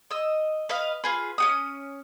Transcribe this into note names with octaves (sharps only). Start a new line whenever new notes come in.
D#5 E6
B4 D#5 F5
F4 G#4 B4
C#4 F#4 D#6